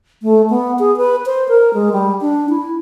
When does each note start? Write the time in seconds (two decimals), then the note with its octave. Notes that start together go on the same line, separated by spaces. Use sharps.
0.23 A3
0.50 B3
0.79 G#4
0.97 B4
1.26 C5
1.48 A#4
1.74 G#3
1.93 G3
2.21 D4
2.49 E4